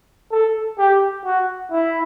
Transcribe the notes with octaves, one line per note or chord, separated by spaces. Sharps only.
A4
G4
F#4
E4